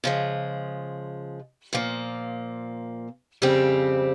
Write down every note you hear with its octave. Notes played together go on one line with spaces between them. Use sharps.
C#3 F3 G#3
A#2 F3 A#3
F2 C#3 G3 C4 G4